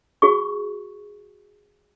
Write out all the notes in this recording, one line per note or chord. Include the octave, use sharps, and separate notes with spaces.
F#4 G#4 C#6